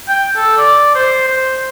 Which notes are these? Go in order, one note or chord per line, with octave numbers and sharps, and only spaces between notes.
G5
A4
D5
C5
C5